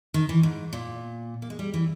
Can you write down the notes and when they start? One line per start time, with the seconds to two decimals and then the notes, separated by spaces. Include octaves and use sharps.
0.14 D#3
0.29 E3
0.43 G#2
0.73 A#2
1.42 A#3
1.50 G#3
1.59 G3
1.74 E3